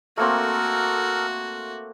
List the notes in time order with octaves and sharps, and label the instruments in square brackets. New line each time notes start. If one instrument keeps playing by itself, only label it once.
[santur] A3 A#3 C4 [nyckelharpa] F#4 [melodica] A4 A#4